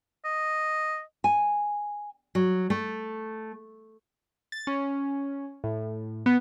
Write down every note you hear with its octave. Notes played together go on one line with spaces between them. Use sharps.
D#5
G#5
F#3
A3
A6
C#4
A2
B3